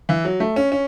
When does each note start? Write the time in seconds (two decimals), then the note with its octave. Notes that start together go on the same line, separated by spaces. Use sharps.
0.09 E3
0.25 F#3
0.40 A3
0.56 C#4
0.72 C#4